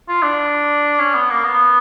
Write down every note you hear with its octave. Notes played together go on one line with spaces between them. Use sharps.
F4
D4
C#4
B3
A#3
B3